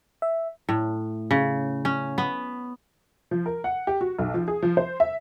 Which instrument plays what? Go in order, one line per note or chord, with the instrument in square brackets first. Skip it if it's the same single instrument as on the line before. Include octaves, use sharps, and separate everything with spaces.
[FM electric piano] E5
[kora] A2
C#3
C#4
B3
[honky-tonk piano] F3
A#4
F#5
G4
F#4
B1
F3
G#4
F3
C5
E5